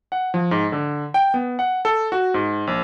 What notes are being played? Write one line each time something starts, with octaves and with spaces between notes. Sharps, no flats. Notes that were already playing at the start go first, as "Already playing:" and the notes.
F#5
F3
G#2
D3
G5
B3
F#5
A4
F#4
G#2
A#1